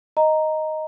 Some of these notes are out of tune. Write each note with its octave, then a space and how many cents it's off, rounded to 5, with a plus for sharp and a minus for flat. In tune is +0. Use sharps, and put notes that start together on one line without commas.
D#5 +0 A#5 +0